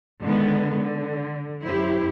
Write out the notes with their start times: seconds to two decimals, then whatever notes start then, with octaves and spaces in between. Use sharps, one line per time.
0.23 D3 D#3 G#3 B3
0.80 D3
1.66 F#2 E4 G4 C5